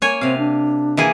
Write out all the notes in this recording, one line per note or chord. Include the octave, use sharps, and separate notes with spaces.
A#3 C#5 G#5
C3 C4 F5
D4
E3 A#3 G#4